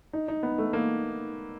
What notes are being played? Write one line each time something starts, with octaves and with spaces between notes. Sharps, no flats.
D#4
D#4
B3
A3
A#3